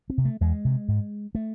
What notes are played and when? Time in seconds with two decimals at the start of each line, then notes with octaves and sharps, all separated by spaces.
0.10 C4
0.18 C3
0.25 A3
0.41 E2 G#3
0.65 C3
0.88 G#2
1.35 A3